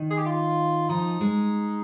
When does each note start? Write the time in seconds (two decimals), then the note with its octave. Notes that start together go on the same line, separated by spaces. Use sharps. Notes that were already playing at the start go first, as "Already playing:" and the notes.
Already playing: D#3
0.10 G#4
0.18 G4
0.26 F4
0.89 F3 D#4
1.21 G#3